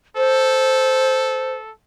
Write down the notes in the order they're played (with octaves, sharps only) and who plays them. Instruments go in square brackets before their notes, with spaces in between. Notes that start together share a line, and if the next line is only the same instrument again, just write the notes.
[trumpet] A4 [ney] C5